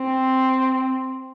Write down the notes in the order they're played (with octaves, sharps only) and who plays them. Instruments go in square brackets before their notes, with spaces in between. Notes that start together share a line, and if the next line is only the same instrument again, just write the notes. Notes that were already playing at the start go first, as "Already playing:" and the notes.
Already playing: [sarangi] C4